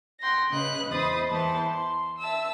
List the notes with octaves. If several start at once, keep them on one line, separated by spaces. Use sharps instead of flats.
F#5 G5 C6 A#6
C#3 C#4 B4 D#5 F#6
E2 C5 D#5 B5 D#6 A6
E2 E3 C5 A5 B5
C6
E5 A5 E6